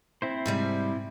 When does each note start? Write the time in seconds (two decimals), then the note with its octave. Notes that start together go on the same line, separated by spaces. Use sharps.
0.22 C4 E4 C5
0.46 G#2 C3 G3